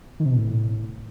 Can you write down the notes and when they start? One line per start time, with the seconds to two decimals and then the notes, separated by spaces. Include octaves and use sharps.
0.20 D#3
0.25 C3
0.31 B2
0.37 A2